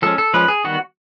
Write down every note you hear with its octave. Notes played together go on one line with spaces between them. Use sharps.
F3 G#3 C#4 A4
A4
F3 G#3 C#4 B4
G#4
D#3 G3 B3 F#4